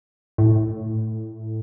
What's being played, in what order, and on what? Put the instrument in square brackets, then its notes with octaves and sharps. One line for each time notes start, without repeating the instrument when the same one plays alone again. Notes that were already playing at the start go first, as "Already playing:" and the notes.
[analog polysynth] A2